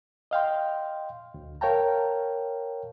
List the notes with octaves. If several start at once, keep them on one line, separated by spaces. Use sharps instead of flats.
D#5 F5 G5 C6
D2
A#4 C#5 F5 G5 A5 A#5